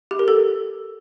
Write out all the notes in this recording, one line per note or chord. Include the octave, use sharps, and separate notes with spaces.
G4
A#4
A4